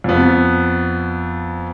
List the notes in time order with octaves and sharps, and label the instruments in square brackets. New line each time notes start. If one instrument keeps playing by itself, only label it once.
[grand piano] F2 B3